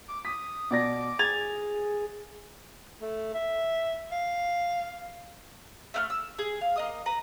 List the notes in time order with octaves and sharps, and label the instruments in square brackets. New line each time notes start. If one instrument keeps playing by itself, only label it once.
[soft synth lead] D6
[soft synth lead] D#6 [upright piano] B6
[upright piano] B2 D5 A#6 [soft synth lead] D6
[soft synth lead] G#4 [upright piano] G#6 A6 F7
[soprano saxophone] A3
E5
F5
[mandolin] A3 F#5 F6
E6
G#4
F5
A#3 D#5 D#6
B4 A#5